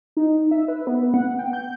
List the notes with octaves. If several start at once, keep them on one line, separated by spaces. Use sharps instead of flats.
D#4
E5
B4
B3
F#5
G5
G6